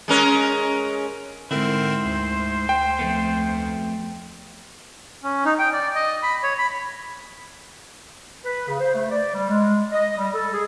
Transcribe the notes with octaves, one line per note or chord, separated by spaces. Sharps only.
G#3 C#4 A#4
G#2 D3 C4 E4 A#4 C5
D2
G5
F2 A3 B3
C#4
D#4
G5
D5
D#5
B5
C#5
B5
B4
C#3
C5
A3
D5
G3
G#3
D#5
G3
A4
G#4